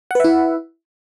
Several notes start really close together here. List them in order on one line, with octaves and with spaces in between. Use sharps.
F#5 B4 E5 E4